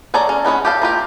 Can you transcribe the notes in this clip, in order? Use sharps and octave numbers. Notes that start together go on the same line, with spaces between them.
G#4 A4 C#5 D5 A#5
C#4
G#3 B3 C#4 C#5
G4 A4 F5
A#3 F4 G4